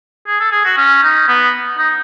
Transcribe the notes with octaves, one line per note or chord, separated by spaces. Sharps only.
G#4
A4
G#4
F#4
C#4
D#4
B3
D#4